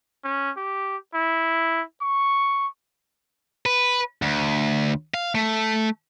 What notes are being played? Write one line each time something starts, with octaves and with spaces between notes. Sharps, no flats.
C#4
G4
E4
C#6
B4
D2
F5
A3